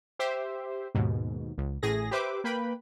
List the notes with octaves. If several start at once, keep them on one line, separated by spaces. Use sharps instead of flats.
G4 C5 E5
D#2 G#2 B2
C#2
A1 A2 G#4 A#6
G4 B4 C5 E5 D6
A#3 B4 G5 B5